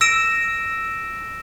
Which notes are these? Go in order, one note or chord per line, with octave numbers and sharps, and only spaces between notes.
E6 A#6 D7 E7